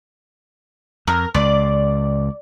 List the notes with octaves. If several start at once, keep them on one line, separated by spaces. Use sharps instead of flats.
F2 A#4
C#2 D5